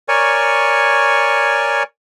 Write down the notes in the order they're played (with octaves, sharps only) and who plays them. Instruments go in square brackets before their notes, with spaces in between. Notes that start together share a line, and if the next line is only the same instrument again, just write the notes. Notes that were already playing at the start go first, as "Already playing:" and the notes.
[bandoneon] A#4 C#5 D5 G#5 C#6